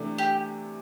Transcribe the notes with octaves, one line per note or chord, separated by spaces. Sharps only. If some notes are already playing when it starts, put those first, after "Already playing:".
Already playing: C3 E3 A3 D4
G4